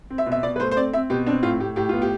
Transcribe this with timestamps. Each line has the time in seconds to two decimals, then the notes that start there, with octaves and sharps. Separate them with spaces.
0.10 C4
0.18 E5
0.26 B2
0.32 E5
0.43 B2 D5
0.56 B4
0.60 A3 C5
0.71 C5
0.77 C4 D5
0.93 C4 E5
1.10 B2 G4
1.27 C4 D4
1.43 A2 F4
1.60 A2 G4
1.76 A2 G4
1.89 B3 F4
2.02 G4